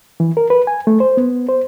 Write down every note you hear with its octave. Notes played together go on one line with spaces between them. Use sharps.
E3
A#4
B4
G#5
A3
C5
B3
C5